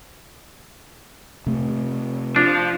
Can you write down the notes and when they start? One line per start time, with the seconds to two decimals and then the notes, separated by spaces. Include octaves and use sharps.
1.47 C3 A3
2.36 F3 D4